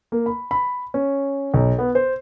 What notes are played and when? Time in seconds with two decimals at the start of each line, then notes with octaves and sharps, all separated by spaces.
0.12 A#3
0.26 B5
0.51 B5
0.94 C#4
1.54 B1
1.78 B3
1.95 C5